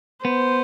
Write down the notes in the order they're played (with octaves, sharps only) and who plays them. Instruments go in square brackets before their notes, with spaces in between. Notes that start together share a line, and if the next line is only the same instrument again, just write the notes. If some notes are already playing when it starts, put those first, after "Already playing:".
[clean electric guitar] B3 [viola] C5